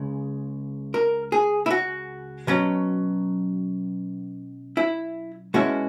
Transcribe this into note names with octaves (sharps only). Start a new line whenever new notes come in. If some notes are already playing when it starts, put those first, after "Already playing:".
Already playing: C#2 C#3 G#3
A#4
G#4
E4
F#4
B2 F#3 C#4
E4
B2 G#3 C#4 E4 F#4